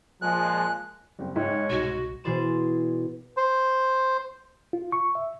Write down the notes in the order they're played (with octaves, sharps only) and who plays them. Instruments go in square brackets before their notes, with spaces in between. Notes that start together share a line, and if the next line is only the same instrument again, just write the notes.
[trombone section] A#2 G#3 [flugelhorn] F3 [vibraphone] G#5 [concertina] F#6
[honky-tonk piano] F#1 [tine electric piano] G3 C4
[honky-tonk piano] G#2 [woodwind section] G#3 C#5 [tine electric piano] E5 G5
[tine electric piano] C2 B2 [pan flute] F#4
[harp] B2 E3 G#4 D5 C6 E7
[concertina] C5
[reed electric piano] F4
C#6
E5